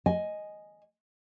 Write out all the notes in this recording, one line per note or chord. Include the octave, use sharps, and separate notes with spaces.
D#5 G#5